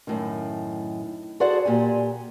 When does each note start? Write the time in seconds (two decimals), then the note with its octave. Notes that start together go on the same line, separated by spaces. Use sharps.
0.07 F#2 A2 D#3
1.40 F#4 G#4 A4 C5 D5 F#5
1.65 A#2 G4 G#5